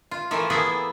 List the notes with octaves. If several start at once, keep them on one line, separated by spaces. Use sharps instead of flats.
F4
E3 F3 A3 A#3
A#3 B3 E4 G#4 A4